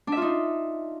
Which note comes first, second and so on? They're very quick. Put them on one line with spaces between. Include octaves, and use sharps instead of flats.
D4 E5 F4 D#4